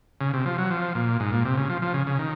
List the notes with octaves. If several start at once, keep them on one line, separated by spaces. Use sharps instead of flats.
C#3
C3
F3
F#3
F3
A#2
G#2
A#2
C3
C#3
F3
F3
C#3
C#3
D#3